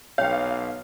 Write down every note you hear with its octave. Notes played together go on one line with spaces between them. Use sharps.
B1 C#5 F5 G5